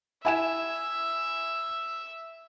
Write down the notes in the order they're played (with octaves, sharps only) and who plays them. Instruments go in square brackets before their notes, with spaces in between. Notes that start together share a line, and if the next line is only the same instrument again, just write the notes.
[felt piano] E4 G#5 E7 [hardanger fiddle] E5